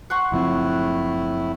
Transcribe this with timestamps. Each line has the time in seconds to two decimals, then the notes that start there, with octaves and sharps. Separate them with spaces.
0.10 F#5 C6 C#6
0.32 F#1 A2 F3 C4 E4